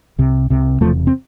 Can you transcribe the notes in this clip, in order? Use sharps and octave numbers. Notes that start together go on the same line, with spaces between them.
C2 C3
C2 C3
E1 E2 C3 F3 A3
C4